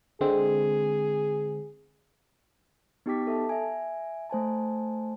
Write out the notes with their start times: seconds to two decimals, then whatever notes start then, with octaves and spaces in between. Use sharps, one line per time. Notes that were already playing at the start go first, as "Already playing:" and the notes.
0.21 D3 G#3 C4 G#4
3.06 B3 D#4 G4 G5 D6 B6
3.27 A4 E5 A5
3.49 E5 G#5
4.30 A3 C5 G#5 A5